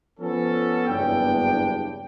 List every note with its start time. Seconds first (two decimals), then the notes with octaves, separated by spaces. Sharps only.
0.20 F3 B3 C#4 A4
0.87 F#1 E2 G2 B3 D4 G5